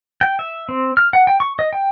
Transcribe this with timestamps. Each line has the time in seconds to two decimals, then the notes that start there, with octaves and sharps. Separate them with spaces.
0.21 G5
0.39 E5
0.69 C4
0.97 F6
1.13 F#5
1.27 G5
1.40 C#6
1.59 D#5
1.73 G5